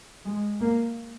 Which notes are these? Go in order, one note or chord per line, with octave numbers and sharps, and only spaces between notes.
G#3
A#3